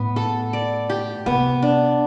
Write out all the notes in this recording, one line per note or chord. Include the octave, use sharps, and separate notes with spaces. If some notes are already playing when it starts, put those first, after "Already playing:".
Already playing: A2 B3
A4
D5
G4
C3 B3
D4